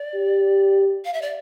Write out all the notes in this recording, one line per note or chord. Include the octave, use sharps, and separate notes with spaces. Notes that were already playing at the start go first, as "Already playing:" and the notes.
Already playing: D5
G4
F5
E5
D5